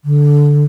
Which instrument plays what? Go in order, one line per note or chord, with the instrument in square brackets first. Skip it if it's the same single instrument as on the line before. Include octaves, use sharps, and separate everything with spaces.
[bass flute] D3